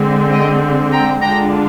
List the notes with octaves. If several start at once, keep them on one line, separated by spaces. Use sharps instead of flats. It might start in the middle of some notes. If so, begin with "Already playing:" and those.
Already playing: D3 G#3 C4
D#5 G5
G5 A#5
D3 G#3 D4 F4 G5 A#5